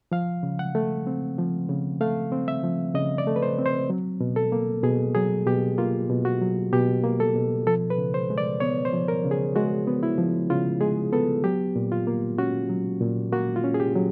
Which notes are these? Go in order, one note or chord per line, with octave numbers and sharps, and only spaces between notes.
F3 F5
C#3
F#5
A3
C4
F3
C#3
A3 F5
C4
E5
F3
C#3 D#5
D5
A3
B4
C5
C4
C5
F#3
B2
A4
A#3
B2 G#4
F#3 G#4
B2 G4
A#3 F4
B2
F#4
F#3
B2 G4
A#3
A4
B2
F3 A4
B4
C#3
C5
G#3
D5
B3 C#5
C5
F3
A#4
C#3
G#4
G#3 F#4
B3
E4
F3
C#3 F4
G#3 G#4
B3 A4
F#3 G4
A#2
F4
A#3
C#4 F#4
F#3
A#2
A#3 F#4
F4
C#4
G#4
G4
F#3